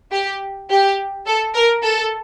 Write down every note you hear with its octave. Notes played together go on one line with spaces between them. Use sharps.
G4
G4
A4
A#4
A4